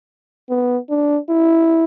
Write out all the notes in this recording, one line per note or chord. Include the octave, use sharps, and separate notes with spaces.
B3
D4
E4